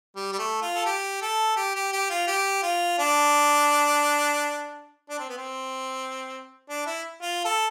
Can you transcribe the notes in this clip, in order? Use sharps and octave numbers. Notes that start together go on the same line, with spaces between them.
G3
G3
A3
F4
A4
G4
A4
G4
G4
G4
F4
G4
F4
D4
D4
C4
B3
C4
D4
E4
F4
A4